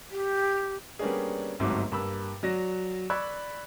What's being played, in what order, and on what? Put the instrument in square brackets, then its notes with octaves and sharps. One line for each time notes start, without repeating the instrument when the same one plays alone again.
[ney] G4
[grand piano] G3 A#3 B3 C#4 D4 G#4
G1 C2 G#2 F#3 A3 D6
G2 A#3 B5 E6
F#3 F#4 D5 A#6
D5 B5 C#6 E6 F#6 G#6